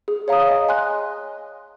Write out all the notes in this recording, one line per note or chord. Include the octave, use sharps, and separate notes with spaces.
G#4
C#5 F5 A#5 D#6
D#5
G#5 C6 F#6